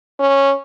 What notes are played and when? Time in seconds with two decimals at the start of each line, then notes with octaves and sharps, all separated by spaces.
0.19 C#4